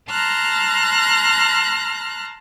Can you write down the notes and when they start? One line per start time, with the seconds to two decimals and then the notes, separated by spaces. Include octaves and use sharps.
0.10 A5 A#5 C6 F6 F#6 A#6